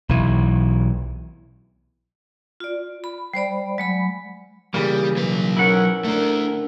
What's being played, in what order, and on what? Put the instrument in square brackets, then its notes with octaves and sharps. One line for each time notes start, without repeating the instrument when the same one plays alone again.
[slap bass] B1 E3
[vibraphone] F4 D5
B5
G3 C5 D5 B5
F#3 G#3 B5
[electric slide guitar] C#3 E3 A#3 [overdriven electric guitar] G3 [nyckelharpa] G#4
[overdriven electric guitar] F#3 B4
[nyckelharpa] C#4 A#4 [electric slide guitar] E4 F#5
[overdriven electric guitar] A3 D4 [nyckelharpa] A#4